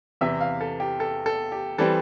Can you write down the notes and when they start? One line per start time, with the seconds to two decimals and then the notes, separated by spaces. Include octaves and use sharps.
0.21 E2 C3 E3 E5
0.41 F5
0.61 A4
0.80 G4
1.00 A4
1.26 A4
1.52 G4
1.78 E3 G3 C4 A4